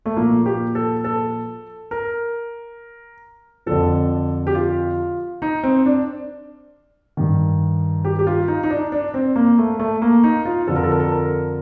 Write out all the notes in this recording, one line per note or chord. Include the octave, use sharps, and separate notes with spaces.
A3
A#2 F3 A#3
G4
A4
A4
A#4
F2 D3 F3 A4
G4
F4
D#4
C4
D4
G2 D#3
G4
G4
F4
D#4
D#4
D4
D4
C4
A#3
A3
A3
A#3
D#4
F4
F2 D3 F3 A4
A#4
A4
A#4
A4
A#4